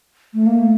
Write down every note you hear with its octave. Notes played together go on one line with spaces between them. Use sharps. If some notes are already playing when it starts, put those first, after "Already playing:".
A3
A#3
A3